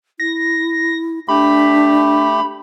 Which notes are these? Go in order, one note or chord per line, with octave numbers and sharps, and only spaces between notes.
E4 A#6
A3 D4 G4 B5